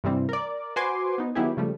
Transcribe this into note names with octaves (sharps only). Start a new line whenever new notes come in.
G2 C3 E3 G3 C4
A#4 D5
F#4 B4 C5 G#5 C6 D6
B3 D#4
D#3 F#3 B3 E4 G4 G#4
C#3 F3 G3 A3